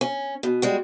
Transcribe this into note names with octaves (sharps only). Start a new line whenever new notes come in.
C#4
B2
G3 G#3 F#4